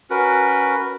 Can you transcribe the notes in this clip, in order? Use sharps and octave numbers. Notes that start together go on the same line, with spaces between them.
C#4 F#4 A#4 B4